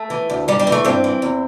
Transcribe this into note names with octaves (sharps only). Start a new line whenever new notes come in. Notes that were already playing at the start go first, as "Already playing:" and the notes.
Already playing: A3
E3
D2
G2 G3
G3
E3
A3
G2 C4
E3
E2